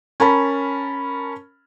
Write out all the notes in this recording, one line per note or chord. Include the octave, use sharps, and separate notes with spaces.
C#4 A#4 A5 B5